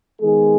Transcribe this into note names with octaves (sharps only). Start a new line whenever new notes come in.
D#3 G#3 B3 G#4